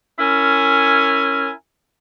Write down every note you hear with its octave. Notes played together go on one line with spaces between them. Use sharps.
C#4 E4 A#4 G#5